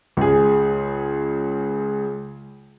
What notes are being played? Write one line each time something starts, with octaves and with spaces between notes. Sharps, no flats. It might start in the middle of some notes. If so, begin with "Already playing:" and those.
C#2 G#4